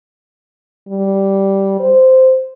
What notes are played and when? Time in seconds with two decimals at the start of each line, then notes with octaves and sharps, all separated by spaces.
0.88 G3
1.80 C5